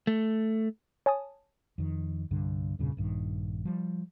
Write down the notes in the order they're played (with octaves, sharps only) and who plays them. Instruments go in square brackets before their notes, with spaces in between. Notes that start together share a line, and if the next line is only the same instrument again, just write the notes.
[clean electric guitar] A3
[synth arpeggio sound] C#5 G#5 A5 D#6
[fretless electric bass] F2 D#3
C2 G2 D3
E2 G2 A#2 C#3
A#1 G2 D#3
F3 G3